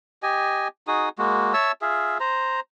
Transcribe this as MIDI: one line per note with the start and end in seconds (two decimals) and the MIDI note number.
0.23 0.68 67
0.23 0.68 75
0.23 0.68 80
0.87 1.09 63
0.87 1.09 66
0.87 1.09 68
0.87 1.09 87
1.19 1.53 56
1.19 1.53 58
1.19 1.53 66
1.54 1.72 73
1.54 1.72 76
1.54 1.72 81
1.54 1.72 88
1.82 2.18 65
1.82 2.18 68
1.82 2.18 76
2.20 2.60 72
2.20 2.60 82